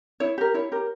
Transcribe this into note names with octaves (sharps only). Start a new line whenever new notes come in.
E4 C#5
G4 A#4
E4 C#5
G4 A#4